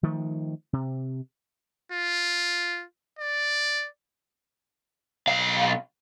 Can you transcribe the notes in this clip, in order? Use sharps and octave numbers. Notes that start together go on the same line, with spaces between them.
D#3 F3 A3
C3
F4
D5
B1 F5